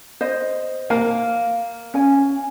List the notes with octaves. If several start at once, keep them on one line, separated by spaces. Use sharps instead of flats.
C5 D#5
A#3 F5
C#4 G#5